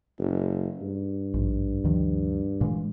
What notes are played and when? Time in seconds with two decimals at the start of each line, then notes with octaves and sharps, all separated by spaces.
0.19 F#1
0.81 G2
1.34 A#1 G#2
1.84 D2 D#3 F3
2.61 A#2 E3 G#3